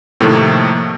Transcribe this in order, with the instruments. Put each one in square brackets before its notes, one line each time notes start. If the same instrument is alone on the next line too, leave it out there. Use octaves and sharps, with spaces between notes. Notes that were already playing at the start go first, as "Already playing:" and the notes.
[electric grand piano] A2 C3 D#3 F3 A3 A#3